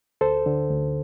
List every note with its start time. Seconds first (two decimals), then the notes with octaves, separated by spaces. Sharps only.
0.21 D2 A4 C5
0.46 D3
0.71 D2